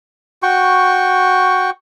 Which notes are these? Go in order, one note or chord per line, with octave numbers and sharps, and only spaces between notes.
F#4 G5 C#6